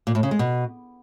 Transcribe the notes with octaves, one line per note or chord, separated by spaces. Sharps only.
A#2
A2
C#3
G#3
B2